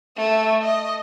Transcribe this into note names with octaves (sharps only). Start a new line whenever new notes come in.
A3 E5
D#5